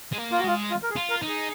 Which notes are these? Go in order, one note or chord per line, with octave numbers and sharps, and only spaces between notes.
G#3
A#3
F4
F#4
G#3 F4
F4
A#4
G#4
F4
A#4
D#4
G#4